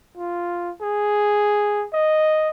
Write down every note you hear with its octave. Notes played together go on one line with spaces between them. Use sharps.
F4
G#4
D#5